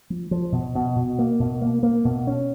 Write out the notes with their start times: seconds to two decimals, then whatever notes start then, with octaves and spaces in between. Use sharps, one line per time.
0.10 F3
0.31 F3
0.52 B2
0.75 B2
0.96 B2
1.19 A#3
1.40 B2
1.62 A#3
1.83 A#3
2.05 B2
2.27 C#4